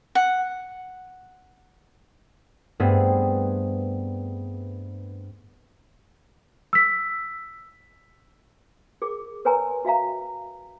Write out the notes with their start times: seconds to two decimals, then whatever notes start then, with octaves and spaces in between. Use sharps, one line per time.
0.15 F#5
2.80 G2 A3 B3 C4 G#4
6.73 E6 B6
9.02 G#4 A#4 D6
9.45 A#4 B4 C#5 G#5 A#5 C6
9.85 F#4 E5 F5 A#5